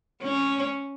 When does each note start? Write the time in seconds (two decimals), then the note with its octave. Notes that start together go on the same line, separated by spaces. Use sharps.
0.22 C#4